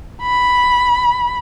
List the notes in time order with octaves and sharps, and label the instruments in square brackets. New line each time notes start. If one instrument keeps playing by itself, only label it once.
[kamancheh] B5